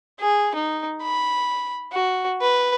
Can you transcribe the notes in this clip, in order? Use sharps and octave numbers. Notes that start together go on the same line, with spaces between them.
G#4
D#4
B5
F#4
B4